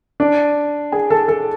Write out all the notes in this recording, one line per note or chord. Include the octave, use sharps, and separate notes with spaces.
D4 D5
G#4 G#5
A4 A5
A4 A5